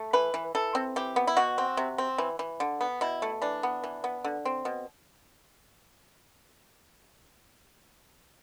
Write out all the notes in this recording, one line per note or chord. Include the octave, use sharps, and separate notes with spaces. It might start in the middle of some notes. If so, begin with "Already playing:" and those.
Already playing: A3
E3 B4
E3
E3 A4
C4
E3 G4
B3
E4
B2 F#4
C4
C3
C4
E3
E3
D3
B3
B2 E4
A3
E3 D4
B3
E3
B3
D3
C4
B2